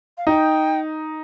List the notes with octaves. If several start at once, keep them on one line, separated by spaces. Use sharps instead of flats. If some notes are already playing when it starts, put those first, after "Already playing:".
F5
D#4 G5